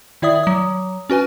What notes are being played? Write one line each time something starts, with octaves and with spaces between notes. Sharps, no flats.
D#3 E4 D5 E5 D#6
F#3 D#6
C#4 F#4 B4 G#5